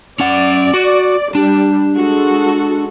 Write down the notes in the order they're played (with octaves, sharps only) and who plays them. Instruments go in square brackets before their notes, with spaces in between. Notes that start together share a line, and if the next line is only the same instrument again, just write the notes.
[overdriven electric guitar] C#4 F#5 [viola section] D5
[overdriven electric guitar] F#4
[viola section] G3 [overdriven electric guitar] D4
[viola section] G#3 F#4 A4